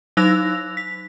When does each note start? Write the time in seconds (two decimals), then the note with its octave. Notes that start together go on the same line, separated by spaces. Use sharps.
0.17 F#3 D#4 E6 F#6 A#6 F7
0.77 B6